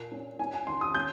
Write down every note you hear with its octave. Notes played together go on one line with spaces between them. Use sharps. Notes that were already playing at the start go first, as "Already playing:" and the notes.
Already playing: A#2 A#3
C#4
C#4 G#5
G#5
D#3 C6
D#6
C#4 G6